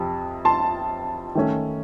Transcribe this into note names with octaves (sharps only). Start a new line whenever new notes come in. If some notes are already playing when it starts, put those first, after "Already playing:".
Already playing: F2 C3 F3
A5 C6
D#3 A3 C#4